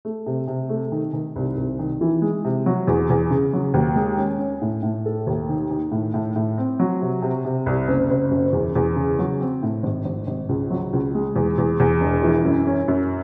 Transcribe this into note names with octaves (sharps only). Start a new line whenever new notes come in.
A3
C3
C3
A3
D#3
D#3
C2
C2
D#3
E3
G#3
C3
F#3
E2
E2
C#3
F#3
D#2
G#3
C#4
C#4
A2
A2
A4
D#2
D#3
D#3
A2
A2
A2
C4
F#3
C3
C3
C3
C2
F#1
F#1
F#2
E2
E2
C#3
F#3
C4
A2
G#1
G#1
G#1
C#2
F#3
C#2
G#3
E2
E2
E2
E1
E3
F#2
C#4
F#2